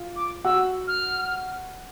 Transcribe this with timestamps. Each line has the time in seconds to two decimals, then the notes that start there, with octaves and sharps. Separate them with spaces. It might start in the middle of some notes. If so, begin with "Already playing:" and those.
Already playing: F4
0.16 D6
0.45 F#4 F#5 E6
0.88 F6